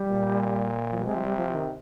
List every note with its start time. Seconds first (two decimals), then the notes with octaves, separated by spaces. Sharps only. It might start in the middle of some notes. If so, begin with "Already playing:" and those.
Already playing: G3
0.11 A#2
0.91 F3
0.99 G3
1.06 C3 G#3
1.16 F3
1.22 G3
1.37 F3
1.53 D#3